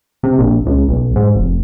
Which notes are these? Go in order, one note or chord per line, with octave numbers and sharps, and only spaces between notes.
C3
A#1
C#2
B1
G#2
F1